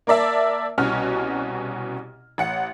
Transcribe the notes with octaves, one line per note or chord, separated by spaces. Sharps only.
A#3 A#4 D5 E5 A5
C2 B2 C#4 F#4 F6
A1 F#5 C#7